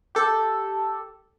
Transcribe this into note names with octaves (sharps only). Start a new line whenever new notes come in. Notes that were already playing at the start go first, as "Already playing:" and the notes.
G4 A4